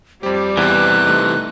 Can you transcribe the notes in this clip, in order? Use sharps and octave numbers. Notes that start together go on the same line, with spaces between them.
F2 G3 G4 C5 D5
E2 C3 E3 F#6
A3 D#4